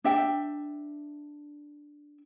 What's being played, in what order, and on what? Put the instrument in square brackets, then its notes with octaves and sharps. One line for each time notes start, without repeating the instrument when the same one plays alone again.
[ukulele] D4 E5 G5